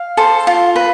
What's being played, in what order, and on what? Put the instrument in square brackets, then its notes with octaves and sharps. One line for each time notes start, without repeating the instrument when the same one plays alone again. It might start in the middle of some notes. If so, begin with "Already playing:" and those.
Already playing: [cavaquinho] F5
A4 C5
F4
B4